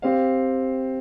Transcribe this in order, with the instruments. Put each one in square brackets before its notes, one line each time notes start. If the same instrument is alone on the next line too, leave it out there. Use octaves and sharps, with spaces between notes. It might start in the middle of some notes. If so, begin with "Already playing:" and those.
[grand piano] C4 G4 C5 F5